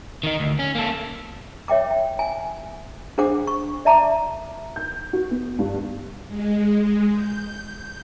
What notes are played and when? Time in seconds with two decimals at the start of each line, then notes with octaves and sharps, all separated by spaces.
0.23 D#3 D#4
0.40 D2
0.59 C#4
0.75 A#3 A4
1.68 C#5 E5 G5 D6
1.91 G5
2.19 G#5
3.18 D4 G#4 C5 F#5 D6
3.47 C#6
3.85 D5 E5 A5 A#5 D6
4.76 G6
5.13 F#4
5.31 B3
5.59 G2
6.27 G#3
7.11 G6